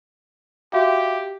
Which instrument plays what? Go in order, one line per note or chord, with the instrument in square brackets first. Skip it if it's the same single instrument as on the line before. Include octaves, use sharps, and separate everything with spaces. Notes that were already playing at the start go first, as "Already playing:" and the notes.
[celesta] F#4 E5 F5 [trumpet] G4